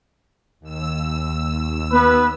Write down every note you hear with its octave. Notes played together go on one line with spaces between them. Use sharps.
D#2 E6
B3 B4